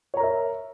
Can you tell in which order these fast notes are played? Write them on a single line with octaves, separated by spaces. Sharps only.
C#5 A#5 A#4 E5